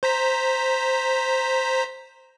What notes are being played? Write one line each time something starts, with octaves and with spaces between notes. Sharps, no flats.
C5 A#5 B6